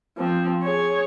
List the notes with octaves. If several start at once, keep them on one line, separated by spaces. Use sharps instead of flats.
F3 C4
G#4 C#5